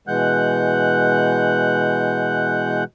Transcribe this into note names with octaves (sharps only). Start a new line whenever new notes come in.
B2 E3 G#3 F#5 F#6 G6